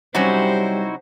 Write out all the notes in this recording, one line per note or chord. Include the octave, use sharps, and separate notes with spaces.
C3 F#3 G3 C#4 D#4 E4 F#4 C5